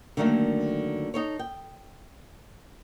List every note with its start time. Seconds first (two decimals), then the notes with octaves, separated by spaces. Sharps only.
0.17 D3 D#3 F#3 A3 A#3 D4
1.14 D#4 A4 C#5
1.39 G5